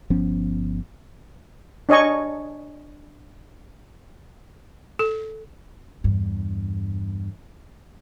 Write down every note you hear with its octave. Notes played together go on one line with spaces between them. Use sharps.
G1 F3 B3 C#4
D4 C#5 D#5 G#5 C#6
A4
E2 G2